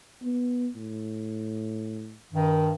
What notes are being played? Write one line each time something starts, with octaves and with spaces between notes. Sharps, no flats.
B3
A2
G2 D#3